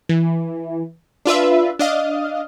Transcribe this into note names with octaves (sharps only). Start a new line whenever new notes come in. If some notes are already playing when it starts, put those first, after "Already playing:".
E3
D4 F4 B4 E5
D4 D#5 F5